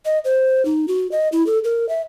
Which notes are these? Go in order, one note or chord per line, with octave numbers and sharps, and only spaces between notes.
D#5
C5
D#4
F#4
D#5
E4
A4
A#4
E5